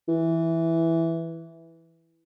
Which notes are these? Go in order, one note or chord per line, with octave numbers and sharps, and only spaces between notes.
E3